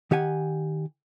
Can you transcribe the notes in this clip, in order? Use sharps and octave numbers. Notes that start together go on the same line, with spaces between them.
D#3 G4 F#5 G#5